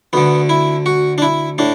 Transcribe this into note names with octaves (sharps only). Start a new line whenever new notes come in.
D2 D3 B3
E4
F#4
D4
E4
A2 D4